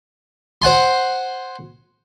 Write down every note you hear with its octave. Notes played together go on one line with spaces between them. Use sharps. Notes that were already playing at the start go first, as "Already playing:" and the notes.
C5 F#5 G#5 C6